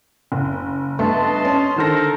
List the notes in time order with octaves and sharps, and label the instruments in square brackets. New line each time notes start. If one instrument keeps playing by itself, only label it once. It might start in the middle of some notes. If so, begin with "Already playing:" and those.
[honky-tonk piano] F#1
[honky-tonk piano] G2 A3 B3 [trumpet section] D#5 A5 C6
[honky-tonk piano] C#4
[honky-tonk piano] D3 D#3 A#6 [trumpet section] A4 A#4 C5